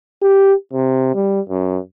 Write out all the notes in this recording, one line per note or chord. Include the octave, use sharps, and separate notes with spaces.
G4
C3
G3
F#2